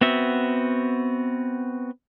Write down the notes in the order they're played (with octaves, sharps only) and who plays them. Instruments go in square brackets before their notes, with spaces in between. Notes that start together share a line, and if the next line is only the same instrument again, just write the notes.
[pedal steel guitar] B3 C4 F#4 E5